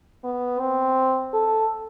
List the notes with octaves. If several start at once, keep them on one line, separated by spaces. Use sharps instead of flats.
B3
C4
A4